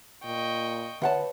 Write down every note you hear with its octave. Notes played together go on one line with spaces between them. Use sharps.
A#2 D#5 G5 C#6
D2 B4 C#5 E5 F#5 A5